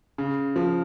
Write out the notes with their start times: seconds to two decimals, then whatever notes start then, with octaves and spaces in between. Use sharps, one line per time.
0.18 C#3
0.56 F3